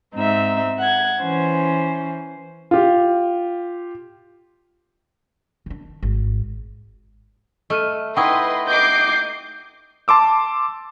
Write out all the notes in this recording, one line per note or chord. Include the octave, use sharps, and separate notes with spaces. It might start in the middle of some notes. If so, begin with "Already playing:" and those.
G#2 C4 D#4 E5
F#5 G#6
E3 C#4 C5
F4 G4
D#3 D4
G#1
A3 D#5 F6 D#7
D#4 E4 B4 D#5 F#5 G5 C6 C#6
D#5 D6 G6 C7
A5 C6 D6 E6